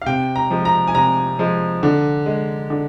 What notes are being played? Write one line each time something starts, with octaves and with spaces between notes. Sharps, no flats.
F5
C3 G5
A#5
F3 G#3
A#5
G#5
C3 A#5
F3 G#3
D3
G#3
D3